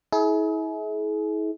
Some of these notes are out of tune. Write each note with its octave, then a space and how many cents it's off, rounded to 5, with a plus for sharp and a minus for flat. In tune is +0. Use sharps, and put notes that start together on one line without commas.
E4 -35 G#4 +35